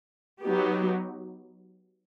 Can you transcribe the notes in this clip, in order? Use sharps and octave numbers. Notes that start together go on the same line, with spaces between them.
F#3 B3 D#4 G4